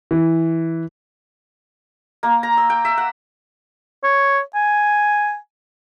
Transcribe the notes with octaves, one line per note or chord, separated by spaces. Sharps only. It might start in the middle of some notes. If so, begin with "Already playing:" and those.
E3
A#3
A#5
E6
G5
E5
F#5
C#5
G#5